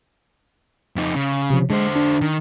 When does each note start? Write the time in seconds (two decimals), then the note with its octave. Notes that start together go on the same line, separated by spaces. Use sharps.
0.96 F2 D#4
1.15 C#3
1.50 C3 F3
1.70 D3 G#3 C5
1.96 D4
2.21 D#3